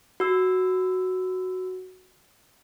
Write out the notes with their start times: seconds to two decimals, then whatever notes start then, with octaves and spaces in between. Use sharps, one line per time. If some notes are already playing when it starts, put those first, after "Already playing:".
0.20 F#4 E6